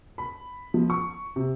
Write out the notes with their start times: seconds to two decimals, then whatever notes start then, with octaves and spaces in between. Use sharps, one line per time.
0.18 B5
0.74 F3
0.90 C#6
1.36 C3